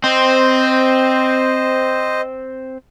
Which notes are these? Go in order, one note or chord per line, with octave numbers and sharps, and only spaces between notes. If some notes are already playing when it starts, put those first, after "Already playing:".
C4 C5 D#5